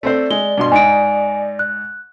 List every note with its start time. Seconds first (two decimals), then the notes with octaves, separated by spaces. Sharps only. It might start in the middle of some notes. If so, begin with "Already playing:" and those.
0.03 A3 C4 C5 D5
0.31 G#3 G7
0.58 G2 B2 C6
0.72 G#2 D#4 G#5 D7
1.59 F#6